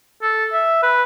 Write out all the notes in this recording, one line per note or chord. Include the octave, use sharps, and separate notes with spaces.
A4
E5
B4